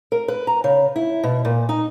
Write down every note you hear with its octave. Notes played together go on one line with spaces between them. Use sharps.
A#4
B4
A#5
C#3
E4
B2
A#2
D#4